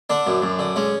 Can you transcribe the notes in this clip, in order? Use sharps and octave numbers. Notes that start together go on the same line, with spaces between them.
D3 D4
F#2
F#2
D3
G#3 C#4